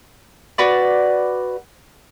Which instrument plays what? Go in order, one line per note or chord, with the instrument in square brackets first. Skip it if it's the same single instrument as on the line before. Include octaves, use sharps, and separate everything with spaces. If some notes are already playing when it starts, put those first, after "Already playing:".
[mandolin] F#4 B4 D5